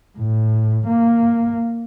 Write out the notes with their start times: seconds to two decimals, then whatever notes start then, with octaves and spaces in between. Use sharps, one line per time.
0.18 A2
0.88 A#3